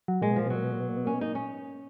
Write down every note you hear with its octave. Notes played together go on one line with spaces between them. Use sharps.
F#3
A#2 G#3
B2
A#2 F3
B2
F#3
A#2
B2
A#2
B2
A#2
B2
A#2 C#4
B2
A#2 D#4
C#4